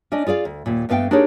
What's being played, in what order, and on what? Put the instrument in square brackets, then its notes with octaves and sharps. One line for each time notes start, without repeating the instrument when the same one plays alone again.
[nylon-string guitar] C#4 D4 D5 D#5
F4 G#4 D5 F5
D2
D#2 A#2
G2 A3 B3 F5 G5
D4 D#4 G4 G#4 A#4 C#5